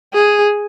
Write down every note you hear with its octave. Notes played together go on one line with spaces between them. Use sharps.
G#4